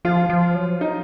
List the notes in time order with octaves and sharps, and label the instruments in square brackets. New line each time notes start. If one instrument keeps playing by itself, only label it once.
[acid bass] F3 [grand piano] F4
[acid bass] F3
F#3
[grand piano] D#4